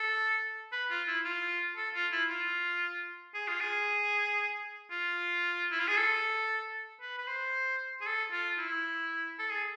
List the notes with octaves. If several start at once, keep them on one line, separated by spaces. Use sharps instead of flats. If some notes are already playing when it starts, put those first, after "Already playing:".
Already playing: A4
B4
F4
E4
F4
A4
F4
E4
F4
G#4
F4
G#4
F4
E4
F4
G#4
A4
B4
B4
C5
G#4
A4
F4
E4
A4
G#4